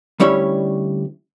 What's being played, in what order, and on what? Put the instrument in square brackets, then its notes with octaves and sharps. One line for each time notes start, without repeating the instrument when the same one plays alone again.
[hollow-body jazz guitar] D2 G3 C#4 E4 C#5